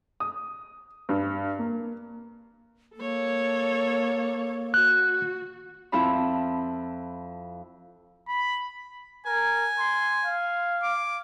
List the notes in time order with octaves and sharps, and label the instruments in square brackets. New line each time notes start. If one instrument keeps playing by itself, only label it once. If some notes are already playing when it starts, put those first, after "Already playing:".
[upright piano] D#6
G2
A#3
[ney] A#3 [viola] A4 C#5
[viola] F#4 [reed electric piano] F#6
[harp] F2 E4 F4 A5 B5
[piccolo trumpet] B5
[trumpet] A#4 [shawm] G#5
[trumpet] C6
F5
[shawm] D6